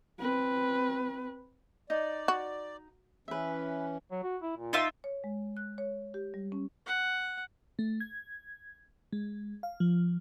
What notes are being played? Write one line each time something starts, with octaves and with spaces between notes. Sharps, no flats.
C4 B4
D#4 D5
F#4
E3 C#4 B4 E5
F#3
F#4
E4
A#2
D#4 F4 E5
C#5
G#3
F#6
C#5
G4
G3
C#4
F#5
A3
G#6
G#3
F5
F3